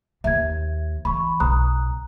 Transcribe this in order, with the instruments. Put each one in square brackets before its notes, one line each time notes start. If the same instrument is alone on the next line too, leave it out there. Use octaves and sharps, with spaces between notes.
[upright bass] D#2 [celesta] E5 G#6
[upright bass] E3 [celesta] B5 C#6
[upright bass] B1 [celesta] A#5 D#6 F#6